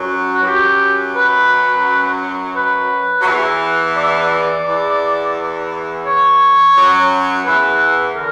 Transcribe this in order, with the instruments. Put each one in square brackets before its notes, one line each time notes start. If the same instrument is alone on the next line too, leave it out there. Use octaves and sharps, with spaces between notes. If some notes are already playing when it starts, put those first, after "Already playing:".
Already playing: [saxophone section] F#2 F#3
[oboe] F#4
[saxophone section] E3
[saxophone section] F#2 F#3 [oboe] G4
[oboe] B4
B4
[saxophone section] F#3
E2 E3
[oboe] D5
E5
D5
[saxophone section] E2 E3
[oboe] C#5
[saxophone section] F#2 F#3
[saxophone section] E2 E3 [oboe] B4
[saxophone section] D3 [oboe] A#4